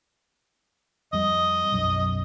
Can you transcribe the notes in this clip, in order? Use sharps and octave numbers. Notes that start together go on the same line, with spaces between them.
F2 G3 D#5
B1 F#2